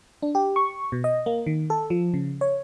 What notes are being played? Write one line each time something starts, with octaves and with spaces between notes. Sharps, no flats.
D4
G4
C#6
B2
D#5
A#3
D#3
A4
F3
C#3
C#5